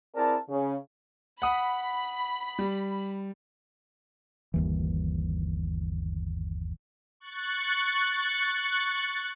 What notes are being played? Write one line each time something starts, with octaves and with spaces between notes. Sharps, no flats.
C4 E4 G#4 A#4 D5 A5
C#3
F#5 B5 D#6
G3
G1 D#2 E3
C#6 F#6 A6 C#7